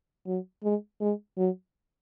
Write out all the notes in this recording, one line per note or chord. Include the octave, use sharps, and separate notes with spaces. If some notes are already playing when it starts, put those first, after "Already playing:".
F#3
G#3
G#3
F#3